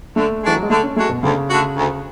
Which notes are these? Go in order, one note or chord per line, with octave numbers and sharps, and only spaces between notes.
D3 A3
E3 G#3 D4 F#4
F#3
G#3
D3 A3
C#4
G#3 A3 D4 F#4
B2
D2 C#3
D3 A3 D4 F#4
D2